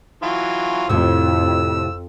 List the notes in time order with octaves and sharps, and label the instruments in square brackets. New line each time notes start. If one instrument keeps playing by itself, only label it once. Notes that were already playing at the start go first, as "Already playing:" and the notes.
[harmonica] E3 F#3 F4
[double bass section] F2 [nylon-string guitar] A2 C3 [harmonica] E6